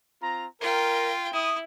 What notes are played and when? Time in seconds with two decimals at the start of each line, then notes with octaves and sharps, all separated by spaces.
0.22 C4 F4 A#5
0.61 F4 A#4 G5
1.33 E4 D#6